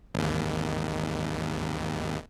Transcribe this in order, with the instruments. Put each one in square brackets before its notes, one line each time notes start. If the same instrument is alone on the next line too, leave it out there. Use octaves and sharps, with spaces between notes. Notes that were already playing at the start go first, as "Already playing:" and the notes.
[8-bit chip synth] G#1 D#2